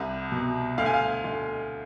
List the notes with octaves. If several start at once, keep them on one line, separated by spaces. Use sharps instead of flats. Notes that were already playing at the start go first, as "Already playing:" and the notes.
Already playing: C2 C3
B2
D2 F5
G#5
F5
D2